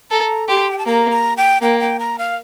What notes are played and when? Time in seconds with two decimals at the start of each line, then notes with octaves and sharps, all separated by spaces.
0.11 A4 A#5
0.48 G4 C6
0.71 G5
0.78 A5
0.86 A#3 A#5
1.11 A#5
1.37 G5
1.62 A#3 G5
1.80 G5
1.99 A#5
2.18 F5